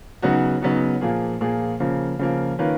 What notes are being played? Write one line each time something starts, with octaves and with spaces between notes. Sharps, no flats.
C#3 F#3 B3 D#4 F#4
C#3 F#3 B3 D#4 F#4
A#2 F3 A#3 F4 G#4
A#2 F3 A#3 F4 G#4
C#3 F3 A#3
C#3 F3 A#3
D#3 A#3 C#4 F4 B4